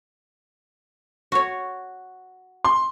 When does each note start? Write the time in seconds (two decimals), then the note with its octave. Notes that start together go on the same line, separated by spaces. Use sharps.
1.32 F#4 C#5
2.64 C6